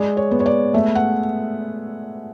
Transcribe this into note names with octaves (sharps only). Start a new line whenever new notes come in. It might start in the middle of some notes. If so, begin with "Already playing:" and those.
Already playing: G#3 D5
C#5
B3
C#5
D5
A3 E5
F#5